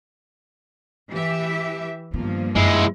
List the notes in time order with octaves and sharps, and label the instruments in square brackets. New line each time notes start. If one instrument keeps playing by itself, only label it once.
[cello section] E3 G4 E5
[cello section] G2 F3 A#3 [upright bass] D#3 B3
[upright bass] F#2 [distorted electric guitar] G#3 E4